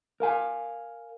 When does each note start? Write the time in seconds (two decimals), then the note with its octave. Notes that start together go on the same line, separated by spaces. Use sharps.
0.20 A#4 F5 G#5